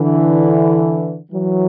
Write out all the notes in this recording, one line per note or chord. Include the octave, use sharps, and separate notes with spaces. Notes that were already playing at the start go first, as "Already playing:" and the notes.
Already playing: D3 E3
E3 F#3